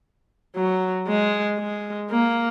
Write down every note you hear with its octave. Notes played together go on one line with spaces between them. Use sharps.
F#3
G#3
G#3
A#3